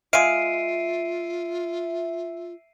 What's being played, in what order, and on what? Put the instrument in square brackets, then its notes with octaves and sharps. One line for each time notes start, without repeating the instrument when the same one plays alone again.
[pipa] G#3 F5 [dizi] F4 [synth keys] E5 [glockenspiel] C7 D7 D#7